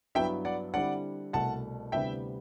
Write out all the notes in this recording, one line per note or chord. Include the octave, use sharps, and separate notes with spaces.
G2 F#3 B3 E4 E5 G5
D5 F#5
D3 G3 C4 E4 D5 F#5
C2 B2 A3 F#5 A5
D2 C3 G3 B3 E4 E5 G5